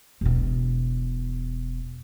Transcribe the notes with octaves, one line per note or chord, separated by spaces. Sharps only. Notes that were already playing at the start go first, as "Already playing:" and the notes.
E1 B2